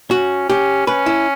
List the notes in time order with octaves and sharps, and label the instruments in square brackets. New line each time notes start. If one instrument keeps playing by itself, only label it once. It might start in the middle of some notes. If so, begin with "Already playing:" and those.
[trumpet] C#4 [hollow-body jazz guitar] F#4
[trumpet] C#4 [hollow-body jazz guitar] G4
[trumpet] C#4 [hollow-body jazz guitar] B4
[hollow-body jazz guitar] E4